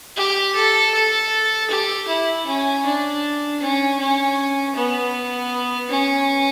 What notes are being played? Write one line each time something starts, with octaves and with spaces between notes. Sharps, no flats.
G4
A4
A4
G4
E4
C#4
D4
C#4
C#4
B3
C#4